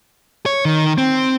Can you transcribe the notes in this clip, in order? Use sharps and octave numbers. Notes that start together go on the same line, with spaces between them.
C#5
D#3
C4